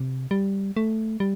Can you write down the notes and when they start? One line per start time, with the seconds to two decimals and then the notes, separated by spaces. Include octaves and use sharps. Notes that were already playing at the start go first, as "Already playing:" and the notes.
Already playing: C3
0.31 G3
0.77 A3
1.20 G3